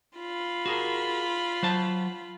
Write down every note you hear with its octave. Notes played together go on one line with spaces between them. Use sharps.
F4 B5
F#4 G#4 A#4
F#3 C5 A5